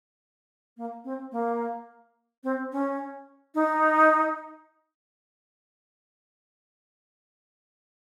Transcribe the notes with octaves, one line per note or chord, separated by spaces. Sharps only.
A#3
C4
A#3
C4
C#4
D#4